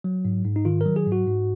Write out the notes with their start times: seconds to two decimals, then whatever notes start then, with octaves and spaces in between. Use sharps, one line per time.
0.04 F#3
0.25 G#2
0.45 G#2
0.56 D#4
0.65 D#3 F4
0.81 A#4
0.86 F#3
0.96 G#4
1.06 G#2
1.12 F#4
1.27 G#2